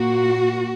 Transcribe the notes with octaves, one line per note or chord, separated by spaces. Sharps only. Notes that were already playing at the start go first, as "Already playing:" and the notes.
Already playing: A#2 A#3 F#4